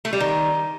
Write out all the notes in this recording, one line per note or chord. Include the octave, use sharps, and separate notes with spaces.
A3
G3
D#3